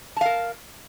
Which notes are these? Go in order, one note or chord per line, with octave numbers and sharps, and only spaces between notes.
A#4 F5 A5